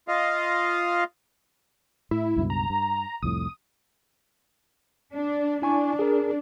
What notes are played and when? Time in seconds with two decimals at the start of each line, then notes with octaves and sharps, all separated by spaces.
0.08 F4 D#5 F5
2.11 A2 E4
2.36 C#2 G2 B2
2.50 A#5
2.70 G2
3.23 C2 F2 A2 D#6
5.13 D4
5.62 D4 E4 G#5 C#6
5.99 G#4 A#4